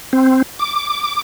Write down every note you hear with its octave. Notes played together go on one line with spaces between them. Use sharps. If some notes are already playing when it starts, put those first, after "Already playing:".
C4
D6